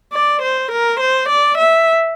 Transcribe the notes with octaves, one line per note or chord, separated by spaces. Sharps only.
D5
C5
A#4
C5
D5
E5